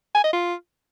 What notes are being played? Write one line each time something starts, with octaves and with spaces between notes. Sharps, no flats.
G#5
D#5
F4